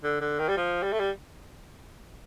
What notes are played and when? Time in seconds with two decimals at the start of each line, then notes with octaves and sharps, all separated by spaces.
0.03 D3
0.21 D3
0.39 D#3
0.49 G3
0.57 F3
0.83 G3
0.92 A3
1.00 G3